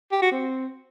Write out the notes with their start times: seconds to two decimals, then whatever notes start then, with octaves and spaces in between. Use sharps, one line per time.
0.12 G4
0.22 F#4
0.31 C4